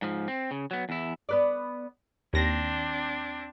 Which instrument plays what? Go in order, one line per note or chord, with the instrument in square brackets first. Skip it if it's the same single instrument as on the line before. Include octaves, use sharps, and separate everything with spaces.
[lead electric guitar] G#2 F3
C4
C#3
F#3 B3
E2 E4
[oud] B3 B4 D5
[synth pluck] D#2 A#6 [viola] C4 D4